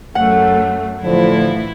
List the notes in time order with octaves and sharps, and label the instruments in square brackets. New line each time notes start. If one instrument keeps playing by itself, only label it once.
[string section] F#2 A3 [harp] F#5
[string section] A2 [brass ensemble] D3 F3 [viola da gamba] E3 E4